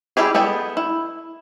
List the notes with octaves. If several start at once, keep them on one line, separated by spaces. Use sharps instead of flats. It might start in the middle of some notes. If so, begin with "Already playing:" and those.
G3 E4 G4 G#4
B3 G#4 A4 G5
E4